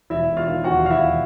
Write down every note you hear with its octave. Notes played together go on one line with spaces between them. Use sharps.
E1 E4 E5
E1
F4 F5
D#3
D#2 F#4 F#5
E1 F5
E4 E5
E1